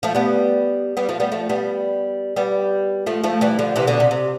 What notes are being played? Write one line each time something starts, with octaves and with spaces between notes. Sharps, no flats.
F3 A3
G3 B3
G3 B3
F3 A3
G3 B3
F3 A3
G3 B3
G3 B3
F3 A3
F3 A3
E3 G3
D3 F3
C3 E3
B2 D3
C3
C3